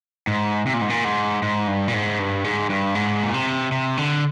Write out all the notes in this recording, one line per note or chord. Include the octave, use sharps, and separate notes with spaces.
G#2
C3
A#2
G#2
A#2
G#2
G#2
G2
A#2
G#2
G2
G#2
G2
G#2
A#2
C3
C3
D3